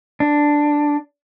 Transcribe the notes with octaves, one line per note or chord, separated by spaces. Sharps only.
D4